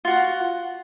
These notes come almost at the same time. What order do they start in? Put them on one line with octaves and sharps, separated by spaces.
F4 F#4 F#5